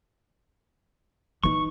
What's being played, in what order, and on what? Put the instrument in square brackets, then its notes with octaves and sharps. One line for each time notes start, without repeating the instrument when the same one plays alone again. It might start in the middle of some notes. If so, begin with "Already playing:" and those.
[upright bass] E3 D#4 [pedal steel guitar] C#6